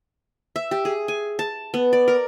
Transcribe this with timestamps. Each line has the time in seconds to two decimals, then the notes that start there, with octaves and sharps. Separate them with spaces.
0.56 E5
0.71 G4
0.85 G#4
1.08 G#5
1.39 A5
1.74 B3
1.93 D5
2.08 A#4